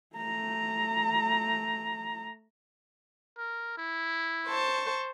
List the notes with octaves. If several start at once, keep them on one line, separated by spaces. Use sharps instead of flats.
A3 A#5
A#4
E4
C5 A5 C#6